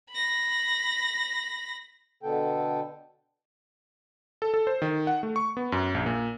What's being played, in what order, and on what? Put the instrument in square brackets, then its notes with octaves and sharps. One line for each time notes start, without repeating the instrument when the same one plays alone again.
[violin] B5 A#6
[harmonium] B2 D3 B3 A4 G5
[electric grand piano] A4
A4
C5
D#3
F#5
A3
C#6
B3
F#2
A#1
A#2